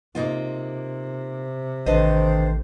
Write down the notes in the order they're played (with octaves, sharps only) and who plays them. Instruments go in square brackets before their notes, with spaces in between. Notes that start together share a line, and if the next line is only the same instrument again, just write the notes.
[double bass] C3 [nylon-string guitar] A#3 D#4 F4
[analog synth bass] A1 [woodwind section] D#3 D4 C5 [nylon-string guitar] A4 B4 D#5